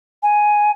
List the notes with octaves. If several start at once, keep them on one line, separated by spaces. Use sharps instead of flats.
G#5